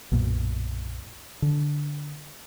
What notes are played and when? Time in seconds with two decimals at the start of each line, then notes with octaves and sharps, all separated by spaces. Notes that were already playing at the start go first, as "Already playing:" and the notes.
0.12 B1 F#2 A#2
1.42 D3